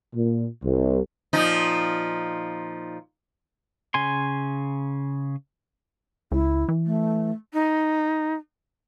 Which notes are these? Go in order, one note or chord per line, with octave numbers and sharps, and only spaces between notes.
A#2
C2
A#2 F3 D#4
C#3 G#5 C6
C#2 E4
E3
A3
D#4